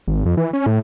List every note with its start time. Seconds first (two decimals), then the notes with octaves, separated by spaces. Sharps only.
0.08 G#1
0.26 F2
0.37 E3
0.53 C#4
0.66 A2